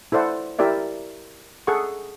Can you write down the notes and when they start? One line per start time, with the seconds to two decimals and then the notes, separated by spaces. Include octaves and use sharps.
0.12 E4 A4 C5 D5 F#5
0.59 E4 G4 A#4 D5 E5
1.67 G#4 A4 F#5 C#6